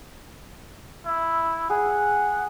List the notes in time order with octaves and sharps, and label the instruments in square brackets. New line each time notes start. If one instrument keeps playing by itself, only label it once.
[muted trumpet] E4
[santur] G#4 [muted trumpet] F#5